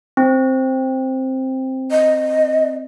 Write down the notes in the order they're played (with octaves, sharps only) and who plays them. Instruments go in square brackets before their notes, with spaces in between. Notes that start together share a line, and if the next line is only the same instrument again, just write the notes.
[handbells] C4
[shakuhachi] D#5